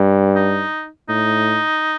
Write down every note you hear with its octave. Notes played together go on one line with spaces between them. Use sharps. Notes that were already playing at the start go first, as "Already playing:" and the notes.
Already playing: G2
D#4
A2 D#4